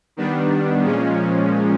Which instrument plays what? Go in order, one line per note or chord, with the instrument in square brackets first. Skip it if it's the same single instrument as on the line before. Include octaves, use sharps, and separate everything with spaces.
[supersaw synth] D#3 G3 B3 D4
A#2 F3 G#3 C#4